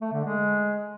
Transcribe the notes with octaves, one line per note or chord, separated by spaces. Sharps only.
A3
D3
G#3